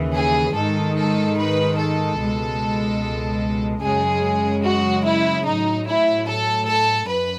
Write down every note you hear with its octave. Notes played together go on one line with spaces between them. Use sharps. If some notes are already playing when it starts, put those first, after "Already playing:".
Already playing: D#2 C#3 E3
G#4
G#2 D#3 G#3 A4
A4
B4
A4
C#2 B2 G#3
F#2 C#3 G#3 G#4
F#4
E4
A2 F#3 D#4
E4
A4
A4
F#2 B4